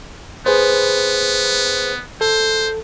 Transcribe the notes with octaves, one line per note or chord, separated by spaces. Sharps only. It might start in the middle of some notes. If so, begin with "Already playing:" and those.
B3 G#4 B4 C5
A4 C5